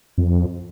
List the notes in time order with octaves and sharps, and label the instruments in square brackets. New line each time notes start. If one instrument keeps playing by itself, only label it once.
[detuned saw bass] F2